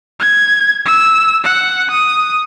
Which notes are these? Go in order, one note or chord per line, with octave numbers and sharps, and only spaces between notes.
G#6
E6
F#5
D#6